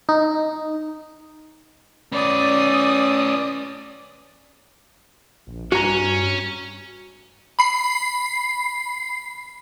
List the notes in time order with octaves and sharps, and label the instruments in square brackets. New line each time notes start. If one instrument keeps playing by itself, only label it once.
[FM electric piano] D#4
[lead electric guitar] C#4 B4 [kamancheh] D5 D#6
[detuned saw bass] A#1
[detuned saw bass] G2 [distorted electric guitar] C#4 [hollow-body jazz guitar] F#4 A#5
[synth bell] B5 C7